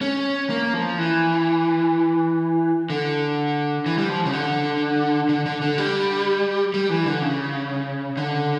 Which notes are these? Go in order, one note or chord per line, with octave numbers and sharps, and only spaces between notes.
C#4
A#3
F3
E3
D3
E3
G3
F3
C#3
D3
D3
D3
D3
G3
G3
E3
D3
C#3
D3